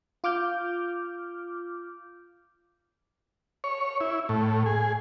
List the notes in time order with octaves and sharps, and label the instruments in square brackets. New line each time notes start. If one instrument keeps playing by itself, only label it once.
[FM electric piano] F4 D6 F6 G6
[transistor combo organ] C#5
E4
A2
G#4